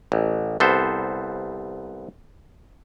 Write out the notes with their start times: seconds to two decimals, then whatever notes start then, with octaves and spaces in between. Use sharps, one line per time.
0.12 A1
0.60 C2 B3 A4 C5